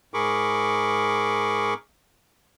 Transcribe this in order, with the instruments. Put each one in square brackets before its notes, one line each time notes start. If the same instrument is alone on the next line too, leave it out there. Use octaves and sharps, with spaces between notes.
[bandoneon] G#2 G#4 A#4 B5 C#6 D6